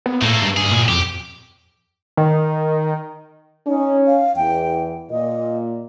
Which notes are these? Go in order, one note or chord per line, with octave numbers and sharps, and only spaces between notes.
B3
A2 A3 A#3
G2
D2 G#4
A#2
F2 G4
D#3
C#4 D#4
F5
E2 G5
A#2 D#5